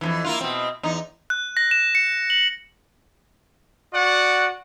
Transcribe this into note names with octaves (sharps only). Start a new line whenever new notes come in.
F2 G#2 E3
A#3 E4 F4
B2 C4
E2 D#4
F#6
A#6
E7
C#7
F#7
F#4 D5 F#5